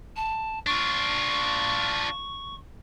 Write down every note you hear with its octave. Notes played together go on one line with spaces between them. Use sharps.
A5
D4 F4 C#6